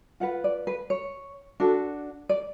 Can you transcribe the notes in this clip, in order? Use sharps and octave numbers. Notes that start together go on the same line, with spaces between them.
F4 B4 F#5
D5
B4
C#5
D4 F#4 A4
D5